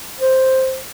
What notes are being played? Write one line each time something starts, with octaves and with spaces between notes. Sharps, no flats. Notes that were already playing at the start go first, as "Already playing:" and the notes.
C5